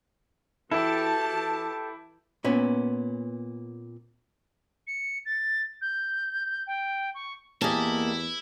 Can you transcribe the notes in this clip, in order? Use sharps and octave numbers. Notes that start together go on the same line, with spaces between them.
E3 E4 F#4 G4 A4 A5
A#2 B3 C#4
C#7
A6
G6
G5
C#6
E2 A#3 E4 G4 D#5 G#5 A5